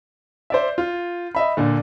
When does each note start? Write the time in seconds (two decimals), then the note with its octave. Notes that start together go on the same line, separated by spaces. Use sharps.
0.50 C5 D5 E5
0.78 F4
1.35 D#5 E5 B5
1.57 A#2 D3